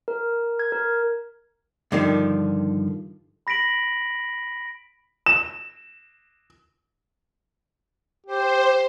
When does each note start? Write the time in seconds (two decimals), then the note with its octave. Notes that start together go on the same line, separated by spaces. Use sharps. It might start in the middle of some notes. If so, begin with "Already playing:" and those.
0.08 A#4
0.59 G#6
0.72 A#4
1.92 G2 D3 D#3 F3
3.47 B5 A#6 B6 D7 F#7
5.26 E7
8.26 G4 C5